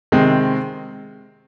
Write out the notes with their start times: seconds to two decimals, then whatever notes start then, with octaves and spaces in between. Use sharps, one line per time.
0.12 C3 D#3 G#3 C4